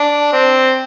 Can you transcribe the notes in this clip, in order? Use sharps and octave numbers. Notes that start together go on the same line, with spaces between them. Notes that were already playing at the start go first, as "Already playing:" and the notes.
Already playing: D4
C4